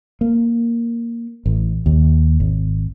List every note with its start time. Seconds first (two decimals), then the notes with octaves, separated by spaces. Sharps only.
0.21 A#3
1.46 A1
1.86 D#2
2.40 G#1